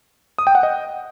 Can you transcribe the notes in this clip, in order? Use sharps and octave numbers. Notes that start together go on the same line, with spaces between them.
D#6
G5
F#5
D#5